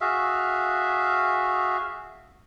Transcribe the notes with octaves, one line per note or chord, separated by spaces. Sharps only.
F#4 G#4 E5 F5